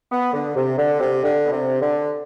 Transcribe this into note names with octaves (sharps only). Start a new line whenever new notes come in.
B3
D3
C3
D3
C3
D3
B2
C3
D3